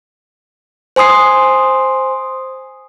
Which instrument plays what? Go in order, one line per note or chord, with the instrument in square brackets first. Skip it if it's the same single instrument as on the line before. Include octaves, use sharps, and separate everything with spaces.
[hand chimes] C5 G#5 C6 D#6 C7